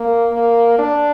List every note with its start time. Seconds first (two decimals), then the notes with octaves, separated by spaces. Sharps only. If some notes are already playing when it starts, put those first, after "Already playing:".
Already playing: A#3
0.31 A#3
0.79 D4